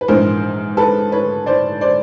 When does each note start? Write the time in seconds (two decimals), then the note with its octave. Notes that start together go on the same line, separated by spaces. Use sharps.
0.01 B4
0.08 A#1 G#2 E3 A#4 C5
0.77 A4 B4
1.12 B4 C#5
1.46 C5 D5
1.81 C5 D5